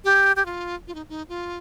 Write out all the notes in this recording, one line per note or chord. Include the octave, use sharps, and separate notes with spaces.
G4
G4
F4
F4
D#4
D#4
F4